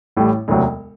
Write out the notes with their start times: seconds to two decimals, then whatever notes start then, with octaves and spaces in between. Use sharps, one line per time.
0.17 A1 A2 G3
0.48 E1 D2 C3 F#3